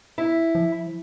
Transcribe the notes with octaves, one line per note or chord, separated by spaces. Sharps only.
E4
F3